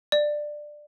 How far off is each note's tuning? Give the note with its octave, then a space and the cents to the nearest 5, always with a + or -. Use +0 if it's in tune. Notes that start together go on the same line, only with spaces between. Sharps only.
D5 +15